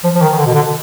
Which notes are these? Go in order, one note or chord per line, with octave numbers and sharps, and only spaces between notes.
F3
F3
D#3
D#3
D3
B2
D3